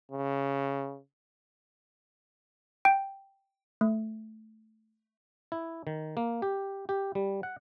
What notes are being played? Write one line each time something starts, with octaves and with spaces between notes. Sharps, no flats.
C#3
G5
A3
E4
D#3
A#3
G4
G4
G3
F#5